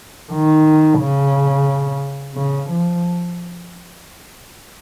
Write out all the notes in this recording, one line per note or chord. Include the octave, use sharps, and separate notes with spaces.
D#3
C#3
C#3
F3